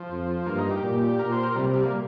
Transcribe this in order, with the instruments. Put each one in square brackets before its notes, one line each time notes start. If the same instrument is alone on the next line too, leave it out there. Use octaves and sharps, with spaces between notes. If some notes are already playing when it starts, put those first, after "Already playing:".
Already playing: [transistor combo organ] F3
[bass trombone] F2
[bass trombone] G2 [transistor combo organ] A#3
[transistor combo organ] D#4
G4
[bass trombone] A#2
[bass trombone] A#2 [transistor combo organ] A#4
[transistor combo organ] C5
A#4
[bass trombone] C3 [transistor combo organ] G3
[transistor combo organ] G3
A#3